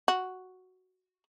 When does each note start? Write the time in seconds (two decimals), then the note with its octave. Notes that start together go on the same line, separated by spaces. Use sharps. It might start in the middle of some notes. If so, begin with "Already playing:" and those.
0.08 F#4